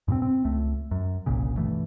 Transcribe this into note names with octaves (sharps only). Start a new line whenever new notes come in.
G2 B2 B3 C4
C4
C#2 A3
F#2
G1 C2 A#2 C#3
G2 B2 E3 A3